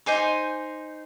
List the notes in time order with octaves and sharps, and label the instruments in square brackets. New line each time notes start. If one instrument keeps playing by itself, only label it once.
[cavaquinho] D#4 C5 G#5 D6